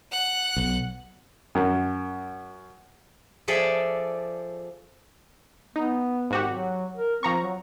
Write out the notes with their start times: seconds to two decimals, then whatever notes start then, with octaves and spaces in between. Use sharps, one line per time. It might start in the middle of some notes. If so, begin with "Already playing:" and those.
0.12 F#5 F#6
0.57 B1
1.55 F#2
3.48 F3 G#4 A4 D5 E5
5.76 B3 D#4
6.30 G#1 F#4 G4
6.50 F#3
6.97 A#4
7.23 F3 C4 A#5 C#6
7.42 F#3